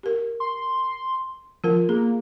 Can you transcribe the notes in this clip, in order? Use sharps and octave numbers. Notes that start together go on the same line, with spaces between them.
G4 A#4
C6
F3 F4 A#4
A#3 G#4